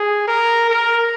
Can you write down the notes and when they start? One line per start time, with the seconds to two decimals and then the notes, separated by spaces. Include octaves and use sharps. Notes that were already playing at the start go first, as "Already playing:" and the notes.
Already playing: G#4
0.28 A#4
0.70 A#4